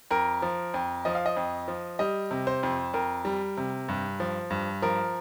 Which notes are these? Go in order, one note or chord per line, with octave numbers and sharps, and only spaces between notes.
F2 A#4
F3
F2
F3 D#5
F5
D#5
F2
F3
G3 D#5
C3
C5
F2
F2 A#4
G3
C3
G2
F3
G2
F3 A#4